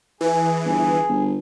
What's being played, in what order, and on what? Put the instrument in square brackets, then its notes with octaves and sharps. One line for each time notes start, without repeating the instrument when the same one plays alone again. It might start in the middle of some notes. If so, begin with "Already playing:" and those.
[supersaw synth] E3 [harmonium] G#4
[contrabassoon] G1
G1